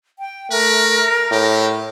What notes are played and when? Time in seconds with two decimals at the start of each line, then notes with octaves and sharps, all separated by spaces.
0.19 G5
0.51 A3 A#4 B4
1.31 A2 G4